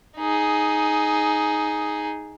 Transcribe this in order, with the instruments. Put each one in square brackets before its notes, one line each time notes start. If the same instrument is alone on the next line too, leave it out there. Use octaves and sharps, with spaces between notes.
[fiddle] D#4 G#4